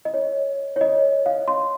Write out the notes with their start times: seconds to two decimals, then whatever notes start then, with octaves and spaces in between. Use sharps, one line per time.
0.05 D#5
0.14 C#5
0.76 C#5
0.81 D#5
1.26 F5
1.48 C6